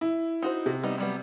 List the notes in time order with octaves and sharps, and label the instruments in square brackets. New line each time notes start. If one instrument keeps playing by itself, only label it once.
[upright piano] E4
[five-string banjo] D#4 F#4 C5
[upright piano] C3
[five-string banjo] G3 B3 D#4
F#3 G3 B3